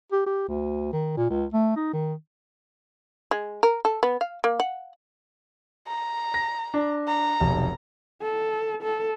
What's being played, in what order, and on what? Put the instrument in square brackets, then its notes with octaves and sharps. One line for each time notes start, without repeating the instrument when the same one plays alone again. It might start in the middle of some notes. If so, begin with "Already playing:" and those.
[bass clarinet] G4
G4
D2
D#3
A#2
C#2
A3
D#4
D#3
[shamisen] G#3
A#4
A4
B3
F5
A#3
F#5
[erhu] A#5
[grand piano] A#6
D4
[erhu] A#5
[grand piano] F1 B1
[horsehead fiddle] A4
A4